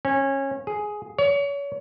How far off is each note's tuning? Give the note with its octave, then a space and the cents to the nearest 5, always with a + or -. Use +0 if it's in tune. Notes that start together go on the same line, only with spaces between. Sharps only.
C#4 -25
G#4 +10
C#5 +35